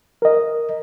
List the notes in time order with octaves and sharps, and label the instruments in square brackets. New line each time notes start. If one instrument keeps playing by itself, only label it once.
[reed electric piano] A#4 D#5